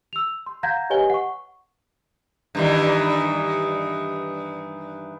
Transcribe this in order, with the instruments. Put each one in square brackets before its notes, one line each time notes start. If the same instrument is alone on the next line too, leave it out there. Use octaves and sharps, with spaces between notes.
[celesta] E6 F7
C6
F5 F#5 A#5 G6 G#6 A#6
G4 B4 C#5 D#5 G#5 G7
F#5 C#6
[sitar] G2 D#3 E3